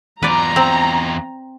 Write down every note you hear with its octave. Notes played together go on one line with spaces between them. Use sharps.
E2 F4 B4 D5 A#5
C4